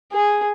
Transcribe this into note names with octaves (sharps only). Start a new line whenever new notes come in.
G#4